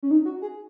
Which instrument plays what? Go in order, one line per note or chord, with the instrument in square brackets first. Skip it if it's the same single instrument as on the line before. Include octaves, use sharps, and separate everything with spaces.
[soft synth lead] C#4
D#4
F#4
G#4